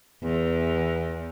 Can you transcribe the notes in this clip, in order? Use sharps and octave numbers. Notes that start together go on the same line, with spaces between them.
E2